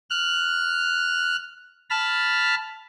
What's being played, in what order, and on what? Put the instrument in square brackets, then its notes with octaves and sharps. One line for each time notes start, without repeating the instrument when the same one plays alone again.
[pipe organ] F6 F#6
A5 B5 F6